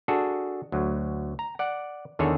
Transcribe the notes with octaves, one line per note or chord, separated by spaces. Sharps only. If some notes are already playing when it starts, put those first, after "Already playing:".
D4 F#4 G#4 A4
D2 F#3
A#5
D5 F#5
E2 D3 D#3 G#4 A4 C#5